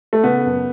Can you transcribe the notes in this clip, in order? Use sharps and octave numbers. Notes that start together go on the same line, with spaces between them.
A3
C#3 B3
F#2